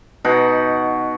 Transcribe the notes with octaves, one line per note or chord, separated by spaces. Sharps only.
B2 D#4 F#5